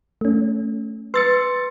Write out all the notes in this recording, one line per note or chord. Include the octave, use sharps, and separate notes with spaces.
A3 C#4
B4 C6 E6 A6 C#7